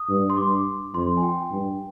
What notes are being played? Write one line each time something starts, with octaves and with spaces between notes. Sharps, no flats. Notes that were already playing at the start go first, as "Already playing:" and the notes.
Already playing: D#6
G2
C6
G2 D6
F2 C6
G#5
G5
G2